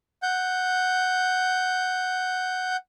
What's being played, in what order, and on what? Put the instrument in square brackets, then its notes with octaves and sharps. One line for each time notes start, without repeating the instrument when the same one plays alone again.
[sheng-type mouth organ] F#5 G6